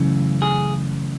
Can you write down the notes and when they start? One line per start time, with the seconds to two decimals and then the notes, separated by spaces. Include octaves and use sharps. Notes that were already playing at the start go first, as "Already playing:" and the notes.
Already playing: F#2 C#3 E3 A3 C#4
0.42 G#4